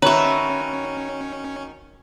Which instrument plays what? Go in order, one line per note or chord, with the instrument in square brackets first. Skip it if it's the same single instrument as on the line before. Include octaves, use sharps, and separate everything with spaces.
[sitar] D#3 F#4 [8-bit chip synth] C#4 [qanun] B4 E5 [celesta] C#5 A#5